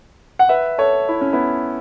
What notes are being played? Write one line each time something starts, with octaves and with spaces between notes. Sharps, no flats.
F#5
B4 E5
A4 C#5
E4
C#4
B3 E4